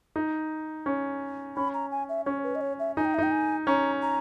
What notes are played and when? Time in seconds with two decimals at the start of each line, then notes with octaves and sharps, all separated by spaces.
0.16 D#4
0.86 C#4
1.56 C#4 B5
1.74 A#5
1.91 G#5
2.09 E5
2.26 C#4 C#5
2.43 B4
2.55 D#5
2.61 C#5
2.79 E5
2.96 D#4 G#5
3.05 G5
3.14 E5
3.18 D#4 G5
3.31 G#5
3.67 C#4 A#5
4.02 A#5